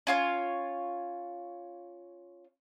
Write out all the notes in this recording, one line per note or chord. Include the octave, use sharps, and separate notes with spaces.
C#4 F4 C#5